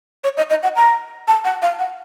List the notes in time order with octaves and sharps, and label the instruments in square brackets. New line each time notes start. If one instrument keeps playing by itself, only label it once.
[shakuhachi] C#5
D#5
D#5
F#5
A#5
A5
F#5
F5
F#5